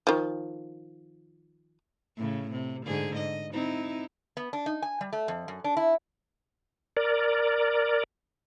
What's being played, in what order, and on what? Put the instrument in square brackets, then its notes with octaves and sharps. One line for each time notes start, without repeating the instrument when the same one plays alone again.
[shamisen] D#3 F3
[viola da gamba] A2 C#3
C3
G#2 D3 G#4
D#5
C4 D#4 E4
[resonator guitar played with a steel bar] B3
D4
D#4
G#5
G3
A3
F2
F#2
D4
E4
[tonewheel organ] A#4 D5